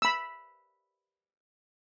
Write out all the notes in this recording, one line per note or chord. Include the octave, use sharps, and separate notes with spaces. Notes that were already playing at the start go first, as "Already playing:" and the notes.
B5 E6